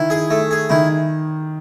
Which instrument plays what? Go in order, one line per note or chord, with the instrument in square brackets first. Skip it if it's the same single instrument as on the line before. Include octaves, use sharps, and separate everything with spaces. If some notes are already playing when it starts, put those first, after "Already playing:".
Already playing: [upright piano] D#3 [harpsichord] E4
[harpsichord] G#4
A3
G#4
[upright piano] D#3 [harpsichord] E4